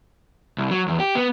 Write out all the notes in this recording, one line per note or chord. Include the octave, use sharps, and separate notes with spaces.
C2
F#3
E2
G4
B3